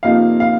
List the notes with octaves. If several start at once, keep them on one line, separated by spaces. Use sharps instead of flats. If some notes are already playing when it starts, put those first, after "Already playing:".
F2 C3 F3 A#3 D#4 F5
F5